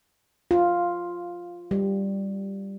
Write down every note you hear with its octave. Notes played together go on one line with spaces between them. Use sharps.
F4
G3